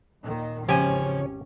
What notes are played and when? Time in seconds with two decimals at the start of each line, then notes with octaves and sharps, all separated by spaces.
0.24 D#2 A#2 D#3
0.69 G#1 E2 C#3 F3 C#4 G4 C#5 G#5